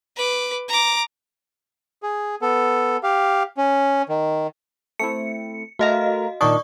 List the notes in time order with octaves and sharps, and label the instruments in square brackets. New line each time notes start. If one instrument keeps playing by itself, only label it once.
[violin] B4 D6
A#5 D6
[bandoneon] G#4
B3 A4
G4 F5
C#4
D#3
[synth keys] A3 C4 E4 [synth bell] C#7
[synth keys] A3 A#4 A#5 [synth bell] F#4 D#5 F5
[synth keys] A#2 D#3 D4 [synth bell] D5 C#6 D#6